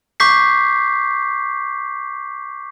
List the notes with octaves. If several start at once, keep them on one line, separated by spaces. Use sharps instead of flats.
C#6 D6 G6 B6 C7